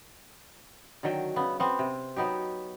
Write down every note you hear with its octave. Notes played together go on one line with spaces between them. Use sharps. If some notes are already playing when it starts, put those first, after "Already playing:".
D3 D#3 F#3 G5
C#3 B3
B3 C4
C3
F#3 B3 D#4 G4